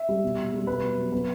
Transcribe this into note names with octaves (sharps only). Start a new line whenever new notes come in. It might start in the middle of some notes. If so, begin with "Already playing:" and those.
Already playing: E5
G3
B2
B2
G3
B2 B4
B2
F#3
B3 B4